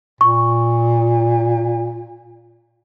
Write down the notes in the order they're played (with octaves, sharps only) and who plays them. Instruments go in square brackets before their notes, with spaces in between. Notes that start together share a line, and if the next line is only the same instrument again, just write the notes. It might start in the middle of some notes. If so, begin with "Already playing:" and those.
[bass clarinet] A#2 [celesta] C#6